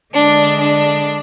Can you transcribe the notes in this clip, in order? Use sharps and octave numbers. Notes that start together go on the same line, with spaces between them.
D3 G#3 D4
D4